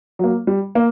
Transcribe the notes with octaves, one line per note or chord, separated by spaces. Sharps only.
F#3 A#3
G3
A#3